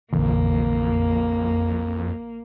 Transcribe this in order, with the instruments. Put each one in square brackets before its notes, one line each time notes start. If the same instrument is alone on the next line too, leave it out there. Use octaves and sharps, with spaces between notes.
[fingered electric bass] A#1 D3 E3 [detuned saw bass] F2 [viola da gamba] A#3